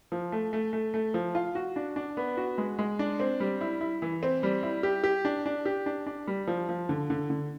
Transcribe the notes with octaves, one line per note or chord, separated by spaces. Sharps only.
F3
A3
A3
A3
A3
F3
F4
F#4
D4
D4
B3
F#4
G#3
G#3
D4
C4
G3
E4
E4
E3
C4
G3
E4
G4
G4
D4
D4
G4
D4
D4
G3
F3
F3
D3
D3
D3